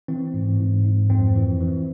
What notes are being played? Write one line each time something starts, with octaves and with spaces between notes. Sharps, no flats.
E3 C4
G#2
G#2
G#2
F2 C4
E3
E3